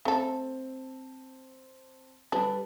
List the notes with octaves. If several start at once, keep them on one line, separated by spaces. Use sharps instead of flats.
A3 C4 A4 A5
G3 D4 A4 B4